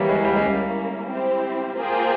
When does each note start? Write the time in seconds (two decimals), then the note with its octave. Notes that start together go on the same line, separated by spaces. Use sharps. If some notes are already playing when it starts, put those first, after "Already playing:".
Already playing: E3 G3 A#3 E4 G4 C#5
0.09 G#3
0.25 G3
0.36 G#3
0.42 G3 A#3 C#4 E4
1.09 C4 E4 G4 C5
1.77 A#3 F4 G#4 C5 G5